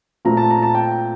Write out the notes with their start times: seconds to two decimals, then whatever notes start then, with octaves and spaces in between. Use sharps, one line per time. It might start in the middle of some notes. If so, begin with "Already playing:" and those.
0.25 A#2 A3 C4 A#5
0.37 A5
0.51 A#5
0.62 A5
0.75 G5